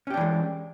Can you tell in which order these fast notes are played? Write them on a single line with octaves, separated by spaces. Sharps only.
C#4 G4 D4 E3 G#3